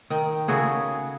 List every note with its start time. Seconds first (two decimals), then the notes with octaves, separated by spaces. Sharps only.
0.10 D#3 G5
0.48 C#3 A3 F#4 G#4